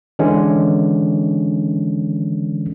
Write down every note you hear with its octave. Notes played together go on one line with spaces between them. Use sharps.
D3 E3 G#3 C#4